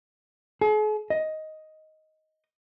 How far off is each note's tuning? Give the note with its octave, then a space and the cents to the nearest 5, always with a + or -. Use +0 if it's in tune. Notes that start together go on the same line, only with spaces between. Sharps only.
G#4 +45
D#5 +10